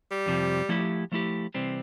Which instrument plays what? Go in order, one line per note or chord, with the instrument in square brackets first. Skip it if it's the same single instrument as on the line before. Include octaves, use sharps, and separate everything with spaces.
[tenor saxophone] G3
[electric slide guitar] F2 C3 F3
F3 A3 E4 G4
F3 A3 E4 G4
C3 E3 G3 C4